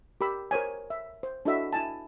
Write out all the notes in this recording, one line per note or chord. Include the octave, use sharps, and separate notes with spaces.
G4 A#4 B5 E6
A#4 C5 C#5 G#5
E5
C5
D4 E4 F#4 A4 D#5 E5
E4 G#5 A5